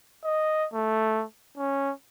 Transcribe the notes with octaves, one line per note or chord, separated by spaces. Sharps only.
D#5
A3
C#4